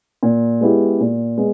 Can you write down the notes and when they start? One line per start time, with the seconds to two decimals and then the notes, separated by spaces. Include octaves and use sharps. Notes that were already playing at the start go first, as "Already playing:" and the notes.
0.23 A#2
0.61 G#3 B3 E4 G4
1.00 A#2
1.38 G#3 B3